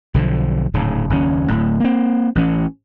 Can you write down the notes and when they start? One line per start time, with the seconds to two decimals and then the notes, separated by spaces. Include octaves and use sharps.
0.14 B1 D3 E3 F3
0.74 D1 G#2 C#3
1.10 F#1 D#2 D#3 C#4
1.49 D1 A2
1.80 A#3 C4
2.35 A1 E3 C#4